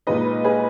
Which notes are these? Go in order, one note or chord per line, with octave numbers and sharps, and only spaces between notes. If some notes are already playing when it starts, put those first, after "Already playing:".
A#2 G#3 D#4 B4 D#5
G#4 B4